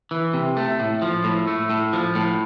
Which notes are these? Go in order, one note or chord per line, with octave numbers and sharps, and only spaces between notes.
E3
C3
A3
A2
F3
A2
A3
A2
F3
A2